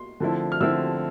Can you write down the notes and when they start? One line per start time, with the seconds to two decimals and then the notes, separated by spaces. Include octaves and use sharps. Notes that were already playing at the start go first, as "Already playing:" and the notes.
Already playing: C6
0.20 D3 F3 A3 C4 E4
0.52 F6
0.60 D3 F3 A3 C4 E4 E6